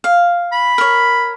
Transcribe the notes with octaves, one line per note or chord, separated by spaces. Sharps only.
F5
B5
A#4 C#5